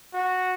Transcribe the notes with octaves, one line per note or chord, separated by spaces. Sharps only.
F#4